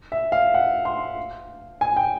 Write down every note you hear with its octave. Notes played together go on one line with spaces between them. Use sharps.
E5
F5
F#5
C6
G#5
G5